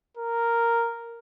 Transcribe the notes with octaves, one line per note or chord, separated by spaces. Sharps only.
A#4